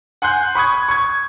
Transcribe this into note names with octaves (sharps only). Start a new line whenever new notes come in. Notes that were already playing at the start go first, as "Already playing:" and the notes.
F#5 G#5 C6 F#6 G6
B5 C#6 D#6 G#6
C#6 G#6